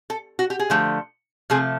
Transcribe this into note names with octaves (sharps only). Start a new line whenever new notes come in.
A4
F#4
G4
G#4
D3 F3 A3
C3 F3 A3 G#4